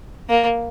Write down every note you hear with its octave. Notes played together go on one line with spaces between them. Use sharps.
A#3